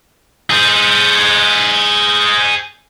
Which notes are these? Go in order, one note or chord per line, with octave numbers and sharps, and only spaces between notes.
G#4 C5